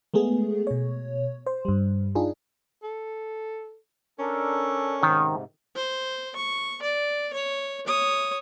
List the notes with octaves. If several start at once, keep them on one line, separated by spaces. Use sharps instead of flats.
G#3 A3 B3 G#4
B2 C#5
C5
G2 G3
D4 D#4 F4 G#4
A4
C#4 D4 A4 A#4
G#2 C3 D#3
C5
C#6
D5
C#5
C#5 D#6